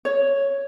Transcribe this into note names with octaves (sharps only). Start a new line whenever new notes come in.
C#5